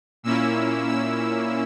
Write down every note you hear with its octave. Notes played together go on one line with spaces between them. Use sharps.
A#2 A#3 C#4 E4 E6
E6